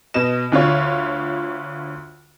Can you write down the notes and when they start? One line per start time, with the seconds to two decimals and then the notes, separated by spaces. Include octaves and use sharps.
0.14 B2 D#5 E7
0.52 D2 D3 F4 C#5